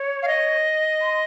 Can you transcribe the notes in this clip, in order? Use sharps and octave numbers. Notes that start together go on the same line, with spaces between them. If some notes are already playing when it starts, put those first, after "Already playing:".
Already playing: C#5
F5
D#5
C6